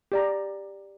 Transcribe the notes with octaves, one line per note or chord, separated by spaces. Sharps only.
G4 D5 A#5